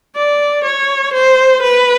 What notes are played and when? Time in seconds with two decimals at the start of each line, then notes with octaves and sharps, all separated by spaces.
0.16 D5
0.65 C#5
1.14 C5
1.63 B4